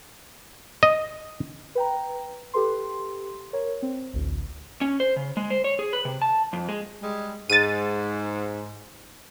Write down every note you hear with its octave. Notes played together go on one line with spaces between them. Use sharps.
D#5
B4 G5 A#5
G4 A4 B4 C6
A#4 C#5
C4
A1 D2
C#4
C5
C#3
G#3
C5
C#5
G#4
B4
C3
A5
F2
G#3
G3 G#3
G#2 A6 D#7